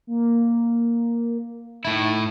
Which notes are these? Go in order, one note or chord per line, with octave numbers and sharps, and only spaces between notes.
A#3
A2 D#4 E4